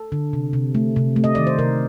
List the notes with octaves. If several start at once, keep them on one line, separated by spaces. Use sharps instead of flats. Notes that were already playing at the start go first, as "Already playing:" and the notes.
Already playing: A4
D3
C3
C3
A3
C3
A3
D#5
D#3 D5
C5
C3 A#4